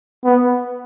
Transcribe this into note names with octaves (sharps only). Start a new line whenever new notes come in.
B3